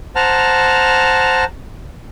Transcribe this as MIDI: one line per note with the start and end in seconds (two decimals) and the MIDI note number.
0.16 1.44 72
0.16 1.44 78
0.16 1.44 81
0.16 1.44 82
0.16 1.44 89